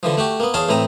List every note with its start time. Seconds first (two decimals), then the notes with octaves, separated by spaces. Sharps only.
0.03 D3 E3 F3
0.17 A3 F#4 G4
0.40 A#3 B3
0.54 E2 G#4 C#5 F5 A5 C6
0.69 A2 E3 C4 A#5 D#6